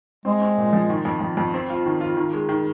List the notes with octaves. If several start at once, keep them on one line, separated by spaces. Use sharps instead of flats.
G#3 C4
C4
A#2
F3
D#3
F2
F2
F2
C4
F4
D#3
F4
D#3
G#3
D#3